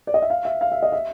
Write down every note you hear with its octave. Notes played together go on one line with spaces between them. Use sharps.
D5
D#5
E5
F5
E5
F5
E5
D#5
E5